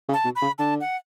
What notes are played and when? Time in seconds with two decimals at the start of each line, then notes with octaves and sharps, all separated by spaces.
0.09 C#3
0.13 A5
0.25 B2
0.36 B5
0.42 C#3
0.59 D3 A5
0.81 F#5